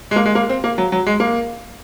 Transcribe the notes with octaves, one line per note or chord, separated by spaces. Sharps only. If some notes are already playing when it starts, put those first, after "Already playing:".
G#3
A#3
G#3
A#3
C4
A#3
F#3
F#3
G#3
A#3